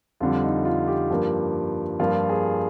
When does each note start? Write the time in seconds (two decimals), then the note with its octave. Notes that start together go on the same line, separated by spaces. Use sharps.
0.20 F2 D3 G3 F4
0.43 D#4
0.65 F4
0.88 G4
1.10 G2 F3 A#3
2.00 G2 F3 A#3 F4
2.29 G#4